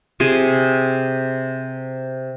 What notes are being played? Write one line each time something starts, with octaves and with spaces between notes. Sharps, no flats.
C3 G#4